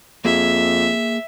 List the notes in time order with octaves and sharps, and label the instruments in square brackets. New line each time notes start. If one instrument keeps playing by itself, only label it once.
[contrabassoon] F2 [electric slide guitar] A#3 G#4 [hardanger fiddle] E5